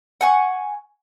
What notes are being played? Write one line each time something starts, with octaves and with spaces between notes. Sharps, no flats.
F#5 G#5 C#6